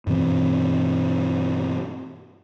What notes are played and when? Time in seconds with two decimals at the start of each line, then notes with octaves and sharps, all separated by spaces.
0.07 G2 B2 E3 C4